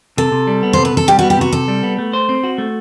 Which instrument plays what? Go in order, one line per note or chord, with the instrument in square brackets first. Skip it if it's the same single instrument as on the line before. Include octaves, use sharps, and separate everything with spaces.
[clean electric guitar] C3 [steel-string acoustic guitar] A4
[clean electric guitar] C3
G3
B3
[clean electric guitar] C3 [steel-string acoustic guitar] C5
[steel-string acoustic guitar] B4
[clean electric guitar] C3 [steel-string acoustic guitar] A4
[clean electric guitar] G3 [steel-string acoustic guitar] G4
[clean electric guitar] B3 [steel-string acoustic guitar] F#4
[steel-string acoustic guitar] G4
[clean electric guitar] C3 [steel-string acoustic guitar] F#4
[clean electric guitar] C3 [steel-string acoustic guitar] A4
[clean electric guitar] G3
B3
A3
C5
C4
F#4
A3